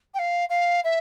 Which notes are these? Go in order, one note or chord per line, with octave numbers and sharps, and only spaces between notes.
G5
F5
F5
E5